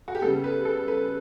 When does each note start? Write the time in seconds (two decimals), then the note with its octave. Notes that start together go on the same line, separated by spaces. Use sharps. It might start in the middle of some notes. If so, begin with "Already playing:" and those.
0.08 F#4
0.15 G4
0.21 C#3 G3 B3 A4
0.44 B4
0.65 A4
0.88 B4